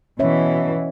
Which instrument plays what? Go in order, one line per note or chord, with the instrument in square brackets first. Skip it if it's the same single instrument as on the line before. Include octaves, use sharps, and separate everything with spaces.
[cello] B2 E3 [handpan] C#4 C#5 E5